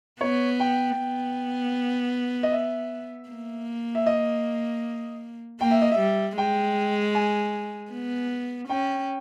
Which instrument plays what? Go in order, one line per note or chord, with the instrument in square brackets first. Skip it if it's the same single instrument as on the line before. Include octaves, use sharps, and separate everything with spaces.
[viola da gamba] B3 [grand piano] C#5
[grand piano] G5
[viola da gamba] B3
[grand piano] D#5
E5
[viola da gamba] A#3
[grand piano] E5
D#5
[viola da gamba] A#3 [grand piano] G5
[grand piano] E5
D#5
E5
[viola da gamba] G3
[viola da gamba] G#3 [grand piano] G5
[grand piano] G#5
[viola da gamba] B3
[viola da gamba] C#4 [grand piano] G5